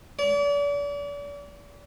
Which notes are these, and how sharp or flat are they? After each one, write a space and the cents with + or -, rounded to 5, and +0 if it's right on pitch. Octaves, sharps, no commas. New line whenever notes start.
D5 -40